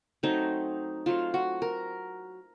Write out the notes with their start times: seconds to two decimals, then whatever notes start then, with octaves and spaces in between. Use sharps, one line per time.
0.23 F#3 A3 C4 D#4
1.06 F#3 A3 C4 F4
1.34 F#4
1.62 A#4